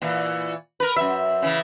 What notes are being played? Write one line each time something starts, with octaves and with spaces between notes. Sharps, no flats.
A#2 E3
A#4 B4
F#2 E5
C#3 E3